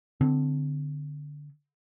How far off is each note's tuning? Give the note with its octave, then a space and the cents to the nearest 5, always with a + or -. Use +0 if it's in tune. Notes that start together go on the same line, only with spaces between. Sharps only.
D3 +0 C4 -20